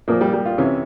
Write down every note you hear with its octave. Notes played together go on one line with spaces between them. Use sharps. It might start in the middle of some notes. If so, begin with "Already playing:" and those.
A#2 F3 A#3
G3
G3
F4
C3 E3 C#4